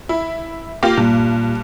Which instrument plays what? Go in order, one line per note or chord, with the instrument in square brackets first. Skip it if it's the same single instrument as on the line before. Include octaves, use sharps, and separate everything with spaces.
[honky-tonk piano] E4
A#3 F4 G4
[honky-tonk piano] G2 [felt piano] A#2